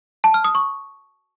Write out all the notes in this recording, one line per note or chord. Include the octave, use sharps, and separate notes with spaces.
A5
F6
D#6
C#6